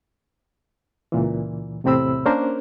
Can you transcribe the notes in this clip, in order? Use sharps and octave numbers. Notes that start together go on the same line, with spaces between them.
C#2 A#2 E3
E2 A2 C3 C4 B5 E6
A#3 C#4 D4 A#4 C5